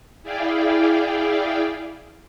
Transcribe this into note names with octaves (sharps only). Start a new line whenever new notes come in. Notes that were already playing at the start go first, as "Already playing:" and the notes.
E4 G#4 D5 F5 G5